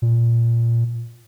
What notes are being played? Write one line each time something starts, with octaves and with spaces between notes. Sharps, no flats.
A#2